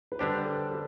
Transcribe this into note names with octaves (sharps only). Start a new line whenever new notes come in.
B4
D3 G3 D4 G4 C5
A4
A4